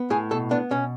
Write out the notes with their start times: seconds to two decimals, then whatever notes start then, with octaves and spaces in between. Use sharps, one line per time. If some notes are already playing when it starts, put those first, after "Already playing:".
Already playing: B3
0.10 A2 G#4
0.31 B2 A4
0.51 B3 D4
0.71 B2 C#4